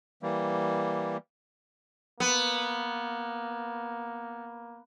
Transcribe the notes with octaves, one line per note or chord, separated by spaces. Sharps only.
E3 G3 A#3
A#3 B3